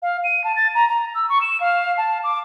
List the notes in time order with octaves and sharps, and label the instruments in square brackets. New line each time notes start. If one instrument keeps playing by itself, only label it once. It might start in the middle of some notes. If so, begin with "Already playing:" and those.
[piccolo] F5
D#7
A5
A6
A#5
A#5
E6
C#6
E7
F5
A5
D6